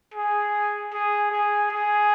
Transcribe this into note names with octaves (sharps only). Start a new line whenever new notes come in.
G#4
G#4
G#4
G#4